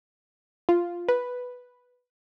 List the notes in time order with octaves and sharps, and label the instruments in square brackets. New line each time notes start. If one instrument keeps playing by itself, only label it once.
[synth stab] F4
B4